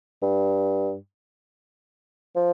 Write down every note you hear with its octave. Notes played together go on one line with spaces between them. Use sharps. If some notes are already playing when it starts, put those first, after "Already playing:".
G2
F3